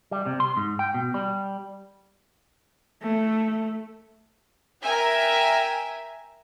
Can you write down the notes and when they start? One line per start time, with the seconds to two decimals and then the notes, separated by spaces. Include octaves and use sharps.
0.11 G3
0.26 C3
0.40 C6
0.57 G#2
0.79 G5
0.94 B2
1.14 G3
3.03 A3
4.83 A#4 E5 G5 G#5